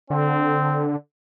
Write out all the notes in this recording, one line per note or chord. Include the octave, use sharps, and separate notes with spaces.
D3 C4